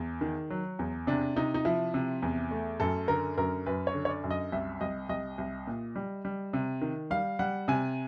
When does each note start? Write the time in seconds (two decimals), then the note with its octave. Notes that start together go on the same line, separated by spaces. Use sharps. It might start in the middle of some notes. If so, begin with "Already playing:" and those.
Already playing: E2
0.21 D#3
0.50 F#3
0.79 E2
1.07 C3 D4
1.36 C3 D#4
1.54 D#4
1.65 F3 E4
1.94 C3
2.22 E2
2.51 A3
2.80 F#2 A4
3.08 D3 A#4
3.37 F#2 A#4
3.66 F#2 B4
3.87 C#5
3.94 D3
4.05 C#5
4.09 D5
4.24 F#2
4.31 D#5
4.52 C2 E5
4.81 C2 D#5
5.09 C2 D#5
5.38 C2
5.67 A#2
5.96 G3
6.25 G3
6.53 C3
6.81 D#3
7.10 G3 F5
7.39 G3 F#5
7.68 C3 G#5